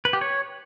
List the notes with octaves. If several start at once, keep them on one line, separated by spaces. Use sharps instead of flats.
B4
G4
C#5